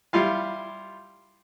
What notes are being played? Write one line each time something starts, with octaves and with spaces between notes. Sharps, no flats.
G3 E4 F4 F5